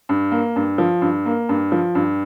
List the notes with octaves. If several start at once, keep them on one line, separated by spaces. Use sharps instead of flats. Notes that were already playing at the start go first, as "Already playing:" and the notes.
G2
A#3
G2
F3
G2
A#3
G2
F3
G2